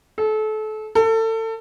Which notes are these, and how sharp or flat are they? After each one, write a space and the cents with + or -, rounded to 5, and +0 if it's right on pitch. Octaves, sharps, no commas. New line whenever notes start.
A4 -30
A4 +30